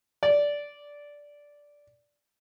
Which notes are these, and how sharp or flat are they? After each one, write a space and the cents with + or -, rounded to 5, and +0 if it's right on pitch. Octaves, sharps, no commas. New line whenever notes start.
D5 -10